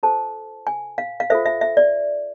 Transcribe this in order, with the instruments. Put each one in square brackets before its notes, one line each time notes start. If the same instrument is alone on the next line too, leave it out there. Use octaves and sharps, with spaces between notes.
[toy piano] F4 A4 C5 A5
G#5
F5
F5
F4 A4 C5 E5
E5
E5
D5